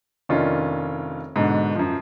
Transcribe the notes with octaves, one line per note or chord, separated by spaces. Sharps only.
F1 D#3 C#4 D4 F4
G#2 B2 D3
F#2 F3